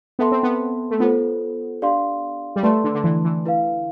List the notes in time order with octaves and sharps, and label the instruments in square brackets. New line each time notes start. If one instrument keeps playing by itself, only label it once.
[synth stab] B3 [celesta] A4 E5 A5 C6
[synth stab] C4
B3
A3
[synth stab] B3 [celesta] F4 A4 C5
[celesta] D4 G4 D5 F5 C6
[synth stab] G3
[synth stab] A3 [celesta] B4 D5 A5 C6
[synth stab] D3
D3
E3
E3
[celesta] E4 B4 F5